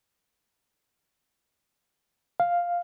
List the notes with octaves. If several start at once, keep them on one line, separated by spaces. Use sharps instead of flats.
F5